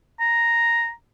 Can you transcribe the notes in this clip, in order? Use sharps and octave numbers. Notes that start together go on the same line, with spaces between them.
A#5